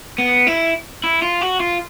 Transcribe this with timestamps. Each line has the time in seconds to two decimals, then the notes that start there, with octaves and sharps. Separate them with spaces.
0.18 B3
0.47 E4
1.04 E4
1.22 F4
1.41 F#4
1.60 F4